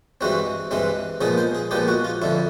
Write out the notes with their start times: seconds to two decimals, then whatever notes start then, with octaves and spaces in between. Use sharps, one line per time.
0.21 G2 E3 G#3 C4 F#4
0.71 G2 E3 G#3 C4
1.21 A#2 F3 G#3 B3 G#4
1.38 C5
1.55 G#4
1.71 A#2 F3 G#3 B3 G4
1.88 F#4
2.04 F4
2.22 F2 D3 F3 E4